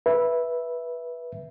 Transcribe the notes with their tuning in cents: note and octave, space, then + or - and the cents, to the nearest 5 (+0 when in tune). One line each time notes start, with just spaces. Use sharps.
B4 -15 E5 +0